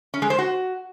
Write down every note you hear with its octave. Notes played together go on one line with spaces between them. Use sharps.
C#4
G#3
C5
F#4